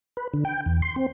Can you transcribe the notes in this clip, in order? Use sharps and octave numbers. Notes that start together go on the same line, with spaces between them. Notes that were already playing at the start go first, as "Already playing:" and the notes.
B4
D3
G5
E2
C6
C4